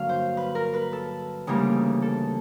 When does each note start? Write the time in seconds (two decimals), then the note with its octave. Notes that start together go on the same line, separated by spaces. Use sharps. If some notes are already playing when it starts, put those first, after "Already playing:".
Already playing: G2 D3 F#3 A#3 F5
0.09 C5
0.37 B4
0.55 A#4
0.74 B4
0.93 A4
1.47 D2 C#3 E3 G3 A#3
2.02 A4